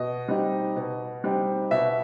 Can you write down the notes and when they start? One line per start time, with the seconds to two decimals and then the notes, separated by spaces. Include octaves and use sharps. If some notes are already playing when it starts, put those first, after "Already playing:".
Already playing: B2 D#5
0.28 G3 C4 D#4
0.76 B2
1.24 G3 C4 D#4
1.71 B2 E5